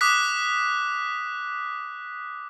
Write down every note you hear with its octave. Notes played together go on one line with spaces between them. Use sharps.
D6 D#6 F#6 B6